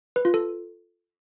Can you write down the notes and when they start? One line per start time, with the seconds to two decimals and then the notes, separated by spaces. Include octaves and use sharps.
0.16 B4
0.25 F4
0.34 A4